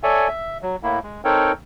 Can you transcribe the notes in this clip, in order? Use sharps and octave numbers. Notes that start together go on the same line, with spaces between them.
A4 C#5 D5 E5 G#5
E5
F#3
A2 A#3 E4
G#3
C4 D#4 A4 A#4 C#5 G5